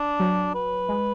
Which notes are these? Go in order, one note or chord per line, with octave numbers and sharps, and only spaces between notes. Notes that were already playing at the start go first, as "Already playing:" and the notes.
Already playing: D4
F#3
B4
G#3